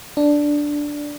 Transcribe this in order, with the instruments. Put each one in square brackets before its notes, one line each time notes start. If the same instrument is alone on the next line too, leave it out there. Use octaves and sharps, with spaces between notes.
[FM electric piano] D4